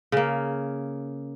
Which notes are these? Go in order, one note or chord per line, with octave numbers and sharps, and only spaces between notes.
C#3 A#3